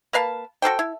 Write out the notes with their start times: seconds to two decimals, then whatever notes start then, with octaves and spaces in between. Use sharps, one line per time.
0.13 A#3 B4 F5 A5
0.62 F#4 A4 C5 G5
0.79 E4